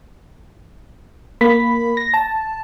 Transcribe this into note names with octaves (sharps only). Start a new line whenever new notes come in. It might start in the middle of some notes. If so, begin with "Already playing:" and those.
A#3 B5 B6
A#6
A5